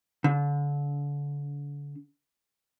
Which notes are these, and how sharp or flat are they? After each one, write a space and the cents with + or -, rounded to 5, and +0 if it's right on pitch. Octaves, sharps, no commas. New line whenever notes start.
D3 -35